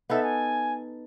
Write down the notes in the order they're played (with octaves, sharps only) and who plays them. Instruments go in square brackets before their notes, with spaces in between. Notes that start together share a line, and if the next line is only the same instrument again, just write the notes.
[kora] B3 D#4 A4 [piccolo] E5
[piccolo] G#5